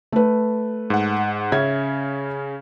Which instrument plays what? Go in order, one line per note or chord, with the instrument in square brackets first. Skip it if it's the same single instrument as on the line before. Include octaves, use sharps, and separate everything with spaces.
[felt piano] A3 B4
[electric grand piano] G#2 F#5
[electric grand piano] C#3 C#4 [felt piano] E5 G#6